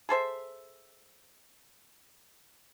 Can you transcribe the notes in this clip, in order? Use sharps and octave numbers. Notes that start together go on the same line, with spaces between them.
G#4 A4 C5 E5